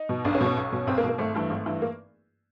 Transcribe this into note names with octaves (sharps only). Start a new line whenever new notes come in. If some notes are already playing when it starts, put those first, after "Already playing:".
Already playing: D#4
B2
B1 D4
C#4
B2
C#4
B1
B2
B1 C4
A#3
B2
A#3
G#1 A3
G2 E3 A3
G#1
G2 E3
A#3